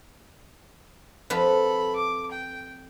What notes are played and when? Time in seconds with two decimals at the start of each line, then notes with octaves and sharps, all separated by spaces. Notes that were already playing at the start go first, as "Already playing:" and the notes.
1.30 F2 F3 A4 B4 B5
1.95 D6
2.31 G5